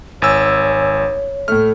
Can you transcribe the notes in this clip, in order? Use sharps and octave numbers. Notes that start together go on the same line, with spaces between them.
G#1 C#5 G#5 E6
A2 A3 F6